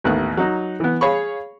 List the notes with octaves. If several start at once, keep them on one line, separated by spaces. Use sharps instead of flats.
A1 D#2 A3 B3 F#6
F#3 D#4
E3 B3
G#4 C#5 F5 B5 C#6